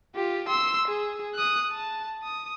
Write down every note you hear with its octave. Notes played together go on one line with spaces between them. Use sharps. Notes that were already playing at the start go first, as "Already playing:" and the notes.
F4 G4
C6 E6
G#4
D#6 F#6
A5
D#6